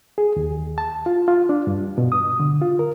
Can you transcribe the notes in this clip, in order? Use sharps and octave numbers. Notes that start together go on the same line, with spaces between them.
G#4
D#2
A5
F4
F4
D4
G2
B2
D#6
D3
F4
A#4